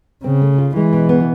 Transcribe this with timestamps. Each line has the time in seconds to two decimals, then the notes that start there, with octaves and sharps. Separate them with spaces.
0.24 C#3 C4
0.41 A3
0.58 F4
0.75 E3 G#3
0.93 B2
1.09 B3